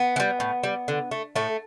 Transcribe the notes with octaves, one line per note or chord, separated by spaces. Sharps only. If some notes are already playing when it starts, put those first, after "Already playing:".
Already playing: B3
E3
G3
A2
G3
D3
A3
A2 A3